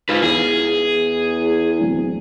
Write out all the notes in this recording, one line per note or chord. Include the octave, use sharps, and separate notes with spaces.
G#2 F4 B4
E2 G#4
D1